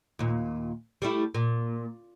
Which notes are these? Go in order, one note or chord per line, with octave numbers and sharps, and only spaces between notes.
D#2 A#2
G3 A3 E4
A#2